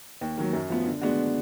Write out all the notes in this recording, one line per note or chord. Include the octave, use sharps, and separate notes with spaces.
D#2
D#3 F#3
F#2
F3 B3
D3
G#3 B3 D4 F#4